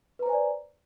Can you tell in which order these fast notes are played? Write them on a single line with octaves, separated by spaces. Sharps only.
B4 A#5 C5 G#5 D5